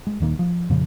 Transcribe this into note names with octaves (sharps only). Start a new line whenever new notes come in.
G#3
D#1 D#3 A#3
F3
F2 A#2 C#3 F3